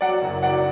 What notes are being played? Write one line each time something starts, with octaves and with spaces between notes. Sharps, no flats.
F#3 D5 F#5
F#1
F#3 D5 F#5